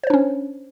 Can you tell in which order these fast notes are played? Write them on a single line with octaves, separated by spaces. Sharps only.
C5 C#5 D4 C#4